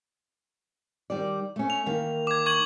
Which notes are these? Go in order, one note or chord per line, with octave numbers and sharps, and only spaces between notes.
D#3 G3 D5
A3 C#4
F7
D#3 E3 A#3
D6 G#6
C#6 G#6 F#7